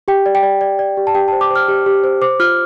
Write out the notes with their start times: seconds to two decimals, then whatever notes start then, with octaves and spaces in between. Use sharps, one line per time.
0.08 G4 G5
0.26 D5
0.35 G5
0.43 D5
0.61 D5
0.79 D5
0.97 G4
1.07 A5
1.15 G4 G5
1.28 A5
1.32 C5
1.41 D6
1.51 C5 F6
1.68 G4
1.86 G4
2.04 C5
2.22 C5 D6
2.40 F4 F6